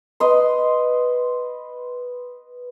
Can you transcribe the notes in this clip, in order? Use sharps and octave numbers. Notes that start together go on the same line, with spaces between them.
B4 D#5 C6